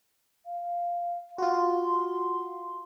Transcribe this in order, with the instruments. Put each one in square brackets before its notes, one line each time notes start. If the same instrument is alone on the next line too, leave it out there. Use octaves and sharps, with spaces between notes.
[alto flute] F5
[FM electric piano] F4 F#4 [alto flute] C6